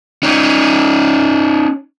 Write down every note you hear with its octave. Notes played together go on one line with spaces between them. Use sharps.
C#4 D#4